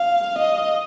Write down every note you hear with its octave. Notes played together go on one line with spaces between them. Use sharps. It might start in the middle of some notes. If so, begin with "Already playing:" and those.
Already playing: F5
D#5